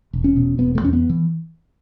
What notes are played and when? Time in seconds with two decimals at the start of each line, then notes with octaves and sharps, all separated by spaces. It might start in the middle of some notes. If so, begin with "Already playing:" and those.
0.13 E1
0.24 C#4
0.36 B2
0.58 E1 B3
0.75 A3
0.81 E2 C#4
0.93 B3
1.09 E3